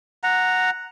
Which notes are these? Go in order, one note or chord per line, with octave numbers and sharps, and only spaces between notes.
F#5 A#5